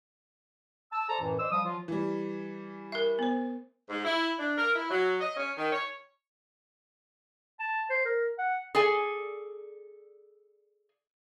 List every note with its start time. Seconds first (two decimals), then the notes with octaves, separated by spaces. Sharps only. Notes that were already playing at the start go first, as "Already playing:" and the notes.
0.93 A5 E6
1.09 A4 C5 D5 A5 A#5
1.21 F#2 A2 E3
1.39 C5 D5 D#5 E6
1.51 F3 G3 F5 D#6
1.65 F3 F#3 F4
1.88 E3 G3
2.92 A#4 E5
3.19 B3 C5
3.90 G#2
4.05 E4
4.39 D4
4.58 A#4
4.76 E4
4.91 F#3
5.21 D#5
5.37 C#4
5.58 D#3
5.72 C#5
7.60 A5
7.90 C5
8.05 A#4
8.38 F#5
8.75 G#4 A4 D5 G#5